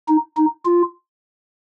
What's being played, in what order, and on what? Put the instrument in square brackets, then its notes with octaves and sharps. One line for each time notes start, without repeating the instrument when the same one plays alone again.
[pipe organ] D#4
D#4
F4